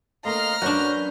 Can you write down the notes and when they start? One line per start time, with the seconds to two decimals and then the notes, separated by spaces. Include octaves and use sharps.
0.25 A3 A#3 D#5 F5 A#5 C6 F6
0.62 F#2 C#4 D4 F#4 B4 G6